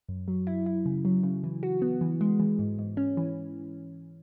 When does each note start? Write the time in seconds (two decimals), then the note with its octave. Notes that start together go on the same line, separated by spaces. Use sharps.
0.08 F#2
0.28 F#3
0.47 E4
0.66 E4
0.86 C#3
1.05 F#3
1.23 C#3
1.44 E3
1.63 F#4
1.82 B3
2.01 E3
2.21 G#3
2.40 E3
2.59 G#2
2.79 G#2
2.97 C#4
3.17 E3